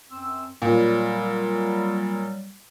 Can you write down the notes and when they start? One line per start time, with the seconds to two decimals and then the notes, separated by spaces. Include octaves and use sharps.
0.10 F#2 C4 E6
0.62 A#2 F#3 G3